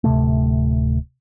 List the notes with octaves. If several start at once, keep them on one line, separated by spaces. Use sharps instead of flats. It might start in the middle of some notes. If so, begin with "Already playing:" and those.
D1 C3 A3